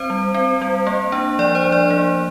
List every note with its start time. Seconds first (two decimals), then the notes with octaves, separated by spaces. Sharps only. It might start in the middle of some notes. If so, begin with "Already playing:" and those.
Already playing: C4 C5
0.10 G3
0.34 C4
0.61 G3
0.87 A#3
1.12 D4
1.39 F3 D5
1.55 C5
1.64 F3
1.72 D5
1.90 A#3